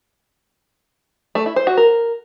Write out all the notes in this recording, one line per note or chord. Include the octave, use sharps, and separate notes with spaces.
A3
E4
C5
F#4
A#4